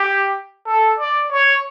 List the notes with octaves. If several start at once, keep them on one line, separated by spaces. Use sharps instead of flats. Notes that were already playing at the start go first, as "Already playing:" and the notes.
Already playing: G4
A4
D5
C#5